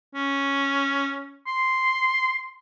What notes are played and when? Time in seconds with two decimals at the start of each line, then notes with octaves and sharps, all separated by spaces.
0.15 C#4
1.47 C6